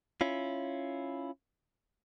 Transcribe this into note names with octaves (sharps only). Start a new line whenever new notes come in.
C#4 E4 F4